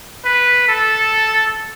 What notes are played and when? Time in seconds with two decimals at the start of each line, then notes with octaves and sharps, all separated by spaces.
0.25 B4
0.69 A4